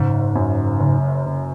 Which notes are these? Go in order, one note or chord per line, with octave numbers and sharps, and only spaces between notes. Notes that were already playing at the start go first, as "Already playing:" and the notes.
Already playing: F#1 G#2
F#2
F#1
F#1